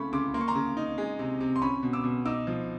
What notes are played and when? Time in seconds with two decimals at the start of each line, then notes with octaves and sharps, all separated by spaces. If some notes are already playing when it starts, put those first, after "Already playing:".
Already playing: C#3 A3 B5 C#6
0.13 C#3 C6 D6
0.34 A#3 C6
0.41 C#6
0.48 A#5 C6
0.55 C#3
0.77 D#4
0.98 G#3
1.19 C3
1.40 C3
1.56 C6
1.62 C#4 B5 C#6
1.83 B2
1.93 D6 E6
2.04 B2
2.25 D#4 D6 E6
2.47 F3